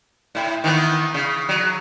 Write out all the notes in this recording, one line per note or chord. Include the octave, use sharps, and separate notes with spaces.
A2 E4
D#3 E3 B3
C#3
F#3